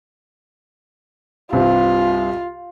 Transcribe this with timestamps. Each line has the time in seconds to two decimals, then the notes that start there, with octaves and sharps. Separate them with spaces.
1.53 C2 G2 C4 F4